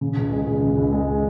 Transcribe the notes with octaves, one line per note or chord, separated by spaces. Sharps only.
C#3
C#2
G#3
C#2
C#3
C#2
G#3